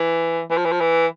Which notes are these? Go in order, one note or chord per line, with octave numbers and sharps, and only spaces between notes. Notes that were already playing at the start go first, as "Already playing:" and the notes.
Already playing: E3
E3
F3
E3
F3
E3